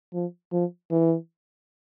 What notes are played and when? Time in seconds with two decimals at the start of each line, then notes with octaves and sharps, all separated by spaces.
0.14 F3
0.52 F3
0.91 E3